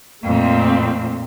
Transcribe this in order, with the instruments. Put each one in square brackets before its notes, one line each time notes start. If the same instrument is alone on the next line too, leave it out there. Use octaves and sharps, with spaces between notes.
[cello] F2 A#2 [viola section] A3 C4